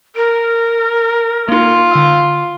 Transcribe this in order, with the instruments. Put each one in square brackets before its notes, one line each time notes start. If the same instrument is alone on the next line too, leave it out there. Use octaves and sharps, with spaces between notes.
[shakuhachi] A#4 [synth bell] D7
[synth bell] A#3 D#4 [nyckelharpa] F4
[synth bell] D3 F5 E6